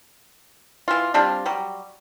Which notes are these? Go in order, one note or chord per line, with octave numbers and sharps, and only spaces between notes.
E3 F4
G3 C4 D4 F4
F#3 G3